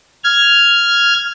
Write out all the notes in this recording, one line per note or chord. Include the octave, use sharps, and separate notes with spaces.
F6 G#6